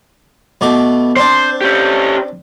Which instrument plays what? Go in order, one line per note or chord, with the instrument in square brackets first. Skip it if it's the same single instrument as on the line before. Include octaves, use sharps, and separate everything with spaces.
[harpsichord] B2 A3 D6
[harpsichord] C4 D4 [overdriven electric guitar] C5
[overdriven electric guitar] C#4 G4